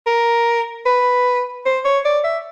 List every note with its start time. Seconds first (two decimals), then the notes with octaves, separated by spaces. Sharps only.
0.07 A#4
0.86 B4
1.66 C5
1.85 C#5
2.05 D5
2.24 E5